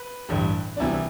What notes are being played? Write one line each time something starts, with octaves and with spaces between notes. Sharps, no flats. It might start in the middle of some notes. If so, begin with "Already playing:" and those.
Already playing: B4
A1 G2 D3
D4
C2 C3 E3 E4